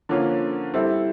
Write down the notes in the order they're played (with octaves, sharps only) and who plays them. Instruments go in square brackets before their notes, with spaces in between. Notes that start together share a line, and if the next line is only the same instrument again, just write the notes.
[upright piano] D3 F3 A#3 C#4 F4
G3 C4 E4 A4